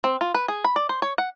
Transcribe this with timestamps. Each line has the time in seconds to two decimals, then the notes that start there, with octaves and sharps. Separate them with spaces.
0.04 C4
0.21 F4
0.34 B4
0.48 G#4
0.64 B5
0.76 D5
0.89 C5
1.02 C#5
1.18 F#5